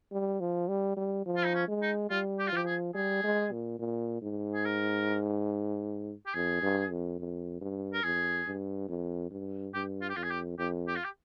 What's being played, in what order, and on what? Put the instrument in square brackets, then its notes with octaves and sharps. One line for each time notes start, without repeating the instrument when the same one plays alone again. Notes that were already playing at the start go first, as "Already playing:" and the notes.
[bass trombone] G3
F3
G3
G3
F3
[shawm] F4
D#4
C#4
[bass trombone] G#3
[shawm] D#4
[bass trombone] G3 [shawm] F4
[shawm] G4
F4
[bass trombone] F3 [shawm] G4
[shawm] G#4
[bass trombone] G3 [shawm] G#4
[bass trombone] G#3
A#2
A#2
G#2
[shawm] G#4
A#4
G4
[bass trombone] F2 [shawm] G#4
[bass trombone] G2
F2
F2
G2
[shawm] A#4
[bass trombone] F2 [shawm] G#4
[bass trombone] G2
F2
G2
[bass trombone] G2 [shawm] G4
[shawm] F4
G4
[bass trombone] F2 [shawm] F4
[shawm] G#4
G4
[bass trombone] F2 [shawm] G4
[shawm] G4
F4
G4